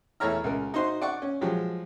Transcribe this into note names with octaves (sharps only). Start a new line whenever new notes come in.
E2 A3 E4 C#5 A#5 F6
C#2 A#4
D#4 F#4 C5 C6
D5 F#5 C#6
C#4
F3 F#3 G#3 G4